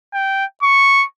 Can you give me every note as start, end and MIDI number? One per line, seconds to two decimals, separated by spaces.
0.14 0.45 79
0.62 1.05 85